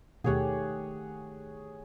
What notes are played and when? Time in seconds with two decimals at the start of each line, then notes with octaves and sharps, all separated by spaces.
0.24 D#2 B2 D#3 A3 G4 G#4 C#5 F#5